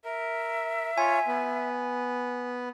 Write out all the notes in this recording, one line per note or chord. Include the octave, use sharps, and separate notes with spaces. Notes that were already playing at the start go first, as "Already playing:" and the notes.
A#4 E5
F4 C#5 G#5
B3